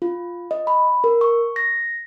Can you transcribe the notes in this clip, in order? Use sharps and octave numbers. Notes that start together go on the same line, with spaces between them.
F4
D#5
B5
A#4
C#6
A#6